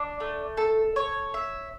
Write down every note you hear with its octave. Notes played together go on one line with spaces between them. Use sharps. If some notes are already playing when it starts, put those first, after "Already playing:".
Already playing: D4
A3
A4
C#5
E5